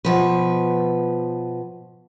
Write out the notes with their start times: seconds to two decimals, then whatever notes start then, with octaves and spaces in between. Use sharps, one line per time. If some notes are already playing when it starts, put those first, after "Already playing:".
0.05 B2 F3 B4